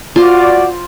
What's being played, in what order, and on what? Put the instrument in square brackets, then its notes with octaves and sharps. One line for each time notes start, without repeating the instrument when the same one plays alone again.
[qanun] F4 C5 [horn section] F#4 D5